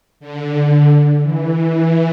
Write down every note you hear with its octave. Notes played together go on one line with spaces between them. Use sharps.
D3
E3